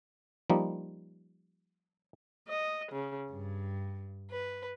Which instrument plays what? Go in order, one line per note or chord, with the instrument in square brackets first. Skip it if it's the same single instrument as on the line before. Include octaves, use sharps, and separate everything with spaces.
[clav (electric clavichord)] F3 G3 A#3 D#4
[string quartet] D#5
C#3
G2
B4